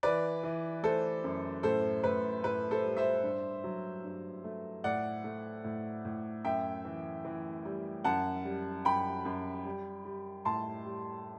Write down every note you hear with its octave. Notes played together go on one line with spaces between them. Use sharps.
E3 B4 D5
E3
A3 A4 C5
F#2
A2 A4 C5
A2 B4
A2 B4
A4 C5
G3
C5 E5
G2
F#3
G2
A3
A2 D5 F#5
A3
A2
A2
F#2 E5 G5
E3
E3
G3
F#2 F#5 A5
G3
F#2 G5 B5
F#2
G3
G3
A2 A5 C6
G3